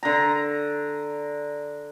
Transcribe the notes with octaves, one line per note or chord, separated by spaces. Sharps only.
D3 A#5